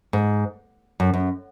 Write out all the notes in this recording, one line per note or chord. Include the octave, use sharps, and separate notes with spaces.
G#2
F#2
F#2